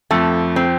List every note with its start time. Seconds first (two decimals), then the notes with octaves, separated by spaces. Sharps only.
0.11 F2 F3 A3
0.56 C4